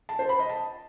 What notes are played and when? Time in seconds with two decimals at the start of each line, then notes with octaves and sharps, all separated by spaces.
0.09 A5
0.19 C5
0.29 B5
0.39 D#5
0.49 A5